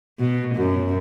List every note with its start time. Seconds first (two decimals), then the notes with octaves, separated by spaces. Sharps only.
0.19 B2
0.56 F#2